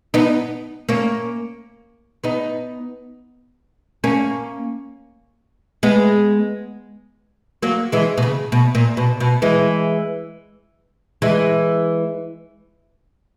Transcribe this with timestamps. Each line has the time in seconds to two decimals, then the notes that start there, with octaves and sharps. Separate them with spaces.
0.14 B3 D#4
0.89 A#3 C#4
2.24 B3 D#4
4.04 A#3 C#4
5.83 G#3 B3
7.62 F#3 A#3
7.92 E3 G#3
8.18 B2
8.22 C#3
8.52 B2
8.75 A#2
8.97 B2
9.20 B2
9.42 E3 G#3
11.22 E3 G#3